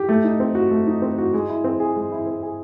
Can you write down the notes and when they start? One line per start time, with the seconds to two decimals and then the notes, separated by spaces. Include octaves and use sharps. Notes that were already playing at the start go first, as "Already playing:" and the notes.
Already playing: G4
0.09 A3
0.24 D#4
0.40 C4
0.55 F#4
0.71 A3
0.87 D#4
1.02 C4
1.18 F#4
1.34 G#3
1.49 E4
1.64 C4
1.80 G#4
1.96 G#3
2.12 E4
2.26 C4
2.43 G#4